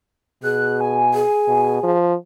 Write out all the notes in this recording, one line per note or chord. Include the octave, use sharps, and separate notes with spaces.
B2 G#4 F#6
G#5
G#4
B2
F3